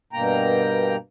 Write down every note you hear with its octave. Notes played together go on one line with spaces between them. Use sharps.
G2 B2 A#3 G5 A#5